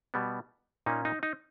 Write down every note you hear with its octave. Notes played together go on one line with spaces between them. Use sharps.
B2 G3 B3
A#2 A#3 C#4 D#4
D#4
D#4